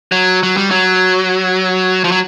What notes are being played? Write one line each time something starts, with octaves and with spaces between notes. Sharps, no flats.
F#3
F#3
G3
F#3
F3
F#3